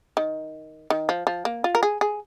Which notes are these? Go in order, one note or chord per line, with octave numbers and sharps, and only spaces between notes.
D#3
D#3
F3
F3
A#3
F4
A#4
G#4
G#4